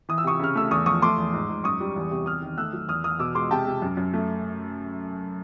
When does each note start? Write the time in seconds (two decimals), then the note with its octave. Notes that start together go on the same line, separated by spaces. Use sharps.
0.09 E3 D#6
0.18 E6
0.24 C3 C#6 D#6
0.39 C#3 F6
0.55 A3 E6
0.71 E2 C#6 D#6
0.86 F3 C#6 D#6
1.02 A3 C6 D6
1.18 E2
1.33 G#2
1.49 G#2
1.64 F#2 C#6 D#6
1.80 G3
1.96 E2
2.11 C3
2.26 C3 D#6 F6
2.42 D#3
2.57 A3 E6 F#6
2.73 F#3
2.89 E2 D#6 F6
3.04 E2 D#6 F6
3.19 B2 D6 E6
3.35 G#3 C6 D6
3.51 C3 G5 A5
3.67 C3
3.82 F#2
3.97 F#2
4.13 A3